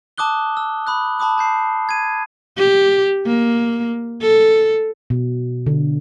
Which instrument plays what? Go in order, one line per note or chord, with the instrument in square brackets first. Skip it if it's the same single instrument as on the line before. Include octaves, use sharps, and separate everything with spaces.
[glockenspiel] A5 D6 D#6 F#6 G7
E6
B5 D#6 F#6
A5 B5 D6 D#6 F#6
A5 G6 C7
G#6 D#7
[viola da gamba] G4
A#3
A4
[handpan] B2
D3